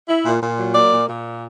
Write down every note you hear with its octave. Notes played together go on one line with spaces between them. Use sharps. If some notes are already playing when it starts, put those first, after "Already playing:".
E4
A#2
A#2
F#3
A#3 D5
A#2
A#2